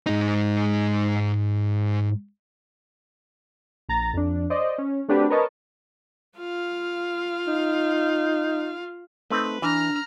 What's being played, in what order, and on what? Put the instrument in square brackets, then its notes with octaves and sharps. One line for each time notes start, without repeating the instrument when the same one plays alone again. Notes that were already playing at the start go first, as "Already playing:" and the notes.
[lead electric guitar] G#2 D#4
[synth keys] A#1 A#5 A6
F2 D4
C5 D5 D#5
C#4
A3 C4 D4 F#4 G4 B4
A#4 B4 C#5 D#5 A5
[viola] F4 F5
[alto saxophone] D#4
[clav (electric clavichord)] A3 C4 D#4 [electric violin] B4
[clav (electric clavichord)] E3 [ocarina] D4 [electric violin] A#5 F6